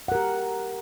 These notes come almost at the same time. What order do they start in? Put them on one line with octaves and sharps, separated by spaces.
F#5 A#4 G4